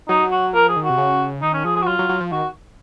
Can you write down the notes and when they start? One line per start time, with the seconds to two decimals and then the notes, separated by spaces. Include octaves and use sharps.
0.08 F#3 D#4
0.32 F#4
0.54 F3 A#4
0.68 G#4
0.76 D#3
0.84 F#4
0.90 C3
0.98 C#3
1.42 D#3 D#4
1.53 C#4
1.65 F3 G#4
1.76 G#4
1.82 F#4
1.87 F#3 F4
1.99 F#3
2.09 F#3
2.21 F3
2.32 D#3 F#4